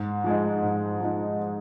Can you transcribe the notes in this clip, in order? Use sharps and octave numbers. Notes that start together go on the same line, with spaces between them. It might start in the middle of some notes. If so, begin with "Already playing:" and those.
Already playing: G#2
F3 G#3 D#4
G#2
F3 G#3 D#4